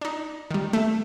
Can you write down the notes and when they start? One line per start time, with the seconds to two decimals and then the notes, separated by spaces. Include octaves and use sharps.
0.01 D4 D#4
0.51 D#3 G3
0.73 A3